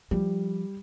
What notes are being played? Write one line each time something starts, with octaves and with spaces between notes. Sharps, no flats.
F3 G3